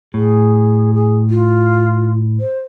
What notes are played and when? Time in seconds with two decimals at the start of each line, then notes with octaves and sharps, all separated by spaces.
0.14 A2 G#4
0.94 G#4
1.30 F4
2.40 C5